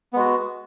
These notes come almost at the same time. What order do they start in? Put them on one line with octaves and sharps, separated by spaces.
B3 G#3 F#4